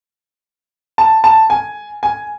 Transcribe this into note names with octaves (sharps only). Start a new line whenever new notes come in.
A5
A5
G#5
G#5